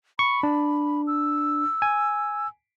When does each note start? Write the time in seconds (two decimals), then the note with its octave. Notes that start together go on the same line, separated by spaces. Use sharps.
0.19 B5 C#6
0.43 D4
1.07 E6
1.82 G#5